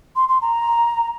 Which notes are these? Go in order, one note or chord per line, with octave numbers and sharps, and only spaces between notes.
C6
C6
A#5